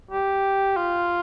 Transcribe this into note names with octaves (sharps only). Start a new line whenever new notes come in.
G4
F4